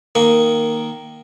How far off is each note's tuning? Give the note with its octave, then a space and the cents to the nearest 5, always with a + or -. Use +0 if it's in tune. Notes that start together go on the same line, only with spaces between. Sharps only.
D#3 +0 A#3 +0 C#6 +0